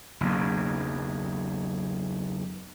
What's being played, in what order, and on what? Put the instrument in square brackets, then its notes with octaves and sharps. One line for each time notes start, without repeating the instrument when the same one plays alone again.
[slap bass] F#1 B1 E2